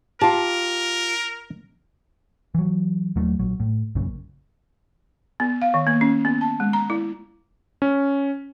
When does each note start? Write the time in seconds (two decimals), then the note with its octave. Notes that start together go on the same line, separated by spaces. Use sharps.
0.21 F4 G4 A#4 A5
2.55 E3 F#3
3.16 D#2 F#3 A3
3.39 A#1 F#3
3.60 A2
3.95 A#1 F#2 A#2 C#3
5.40 B3
5.62 F5
5.74 D#3
5.87 A#3
6.01 C#4
6.25 B3
6.41 A5
6.60 G#3
6.73 A#5
6.90 E4
7.82 C#4